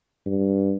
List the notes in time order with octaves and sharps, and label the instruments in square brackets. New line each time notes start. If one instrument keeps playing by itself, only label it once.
[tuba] G2